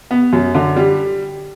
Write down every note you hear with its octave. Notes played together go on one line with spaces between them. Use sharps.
B3
F#2
D3
G3